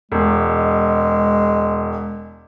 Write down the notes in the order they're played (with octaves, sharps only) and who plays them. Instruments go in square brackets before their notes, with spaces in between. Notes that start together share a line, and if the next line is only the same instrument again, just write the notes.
[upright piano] E1 [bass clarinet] G#3